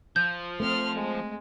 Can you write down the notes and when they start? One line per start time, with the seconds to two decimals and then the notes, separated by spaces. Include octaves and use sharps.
0.16 F3 G6
0.60 A3 B3 C4 C6 F6
0.95 G#3